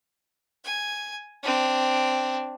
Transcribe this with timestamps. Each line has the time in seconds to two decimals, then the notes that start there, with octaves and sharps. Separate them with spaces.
0.64 G#5
1.43 C4 D4